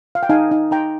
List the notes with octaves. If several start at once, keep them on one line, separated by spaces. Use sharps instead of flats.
F5
G5
D#4 F5 G#5
D#4
D#4 G5 A#5